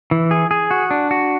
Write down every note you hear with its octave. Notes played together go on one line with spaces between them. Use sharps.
E3
G#4
G#4
F#4
D4
F#4